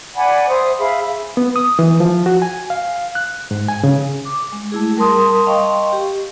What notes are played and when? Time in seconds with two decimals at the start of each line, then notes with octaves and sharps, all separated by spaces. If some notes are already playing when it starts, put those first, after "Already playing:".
0.15 D5 F#5 G#5 B5
0.49 C5 E5 D#6
0.78 G#4 E5 F5 B5
1.37 B3
1.56 D#6
1.79 E3
2.00 F3
2.26 F#4
2.42 G#5
2.70 F5
3.15 F#6
3.51 G#2
3.68 G#5
3.84 C#3
4.25 D6
4.53 G#3
4.72 A3 E4 G#4
4.97 G3 A#4 A5 C6 D#6
5.46 D#5 F5 G5 C6 C#6
5.93 G4